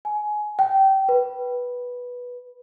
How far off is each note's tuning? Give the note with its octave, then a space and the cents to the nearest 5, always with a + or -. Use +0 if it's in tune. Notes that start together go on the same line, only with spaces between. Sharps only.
G#5 +20
G5 -25
B4 -10